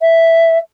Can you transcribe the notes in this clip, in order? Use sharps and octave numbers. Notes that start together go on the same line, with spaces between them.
E5